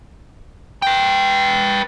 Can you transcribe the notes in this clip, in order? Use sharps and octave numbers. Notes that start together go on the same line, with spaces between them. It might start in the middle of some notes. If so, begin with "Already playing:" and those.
B4 G5